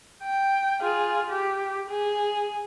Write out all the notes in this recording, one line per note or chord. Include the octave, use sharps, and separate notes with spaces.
G5
F4 G#4
G4
G#4